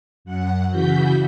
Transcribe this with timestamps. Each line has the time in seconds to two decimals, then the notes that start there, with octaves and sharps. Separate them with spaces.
0.25 F#2 F#5
0.71 C#3 E3 F#4 G6 B6